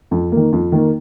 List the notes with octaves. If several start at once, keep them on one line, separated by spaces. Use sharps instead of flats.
F2
D#3 A#3
F2
D#3 A#3